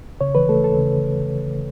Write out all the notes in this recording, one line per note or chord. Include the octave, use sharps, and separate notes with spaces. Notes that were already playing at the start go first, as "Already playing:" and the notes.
C#3 C#5
E3 B4
A3 A4
D#2 A4
C#3